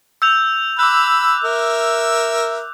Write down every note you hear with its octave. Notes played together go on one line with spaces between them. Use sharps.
E6 G6 F7
B5 D6 E6 F#6
A#4 E5